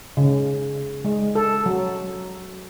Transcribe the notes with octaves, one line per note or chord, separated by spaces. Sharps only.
C#3
G#3
A4
F#3